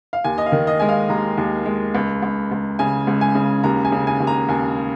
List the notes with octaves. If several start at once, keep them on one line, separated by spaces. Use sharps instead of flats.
F5
D#2 G#5
D#5
F5
D#3
D#5
G#3 G#5
F5
D#2 A#5
D#2
G#3
C#2
C#2
C#2
C#3 G#5
C#2
G#5
C#3
D#2 A#5
G#5
C#3
G#5
D#2
A#5
D#2 G#5